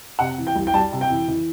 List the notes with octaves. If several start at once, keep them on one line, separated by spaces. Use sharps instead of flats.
C3 F#5
E3
G5
C2
G5
G3 A5
C3
G5
E3
E3